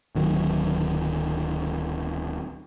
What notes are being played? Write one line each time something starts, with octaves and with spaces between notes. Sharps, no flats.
D1 D#3 F#3